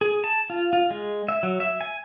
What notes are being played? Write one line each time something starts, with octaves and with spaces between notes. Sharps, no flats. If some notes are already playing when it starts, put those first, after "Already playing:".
G#4
A5
F4
F4
G#3
E5
F#3
E5
G#5